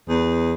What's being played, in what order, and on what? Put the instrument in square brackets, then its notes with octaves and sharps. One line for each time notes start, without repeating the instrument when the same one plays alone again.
[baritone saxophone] E2